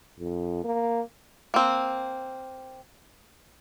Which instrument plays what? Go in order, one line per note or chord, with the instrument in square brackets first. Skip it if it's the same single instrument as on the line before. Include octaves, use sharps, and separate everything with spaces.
[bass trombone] F2
A#3
[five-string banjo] A#3 C4